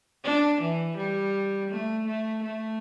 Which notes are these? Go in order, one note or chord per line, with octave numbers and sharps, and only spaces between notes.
D4
E3
G3
A3
A3
A3